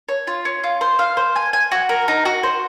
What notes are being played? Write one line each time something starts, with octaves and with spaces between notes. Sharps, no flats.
C#5
F4
C#4
F4
C5
F5
C5
G#5
G#5
F#4
A#4
D#4
F#4
C5